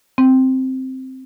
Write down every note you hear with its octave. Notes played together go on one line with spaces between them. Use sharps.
C4